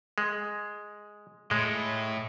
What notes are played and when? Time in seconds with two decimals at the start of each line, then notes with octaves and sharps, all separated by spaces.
0.18 G#3
1.51 A2 G#3